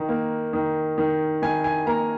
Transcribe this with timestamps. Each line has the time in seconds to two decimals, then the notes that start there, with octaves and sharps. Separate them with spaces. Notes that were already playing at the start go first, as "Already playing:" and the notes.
Already playing: D#3
0.09 A#3
0.53 D#3
0.98 D#3
1.42 D#3 G#5
1.64 G#5
1.86 A#3 A#5